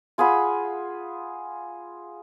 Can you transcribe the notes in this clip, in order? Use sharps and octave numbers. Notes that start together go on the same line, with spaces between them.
F4 G#4 F#5 B5